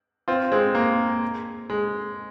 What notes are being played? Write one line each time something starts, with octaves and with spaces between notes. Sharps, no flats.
C4 F4
G#3 C4
A#3
G#3